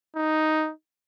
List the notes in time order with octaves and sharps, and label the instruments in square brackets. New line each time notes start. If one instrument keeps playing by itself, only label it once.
[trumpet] D#4